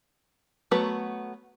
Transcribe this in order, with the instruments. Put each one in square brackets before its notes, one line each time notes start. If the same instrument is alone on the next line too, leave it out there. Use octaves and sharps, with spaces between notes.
[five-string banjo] F#3 A3 B3 F#4 B4